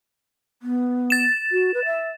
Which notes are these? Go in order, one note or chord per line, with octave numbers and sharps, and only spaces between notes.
B3
A6 E7
F#4
B4
E5